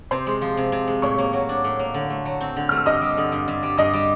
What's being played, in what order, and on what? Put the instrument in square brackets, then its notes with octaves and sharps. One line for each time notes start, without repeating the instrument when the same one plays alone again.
[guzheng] C3 [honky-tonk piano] C5 C6
[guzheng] G#3
F3
C3
C3
G#3
[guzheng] A2 [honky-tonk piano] C#5 C#6
[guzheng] A#3
F#3
D4
A2
A#3
D3
A3
F#3
C4
D3
[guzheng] A3 [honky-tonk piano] F6
[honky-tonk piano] E6
[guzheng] G2 [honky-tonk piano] D#5 D#6
[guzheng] G3
D3
G2
G2
G3
[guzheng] G2 [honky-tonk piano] D#5 D#6
[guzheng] G3